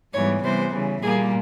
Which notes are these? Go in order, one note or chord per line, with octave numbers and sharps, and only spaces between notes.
G#2 E3 G3 B3 C#5
C3 E3 G3 B3 C5
C#3 E3 G3
A#2 G3 A#3 G#4